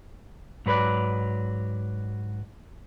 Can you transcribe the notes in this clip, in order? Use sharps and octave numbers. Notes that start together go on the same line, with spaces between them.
G#2 F#3 B4 D5